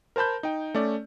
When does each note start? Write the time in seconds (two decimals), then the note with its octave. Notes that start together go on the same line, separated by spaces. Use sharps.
0.16 A#4 C5 A5 B5 G6
0.43 D#4 G5
0.75 A3 C#4 D5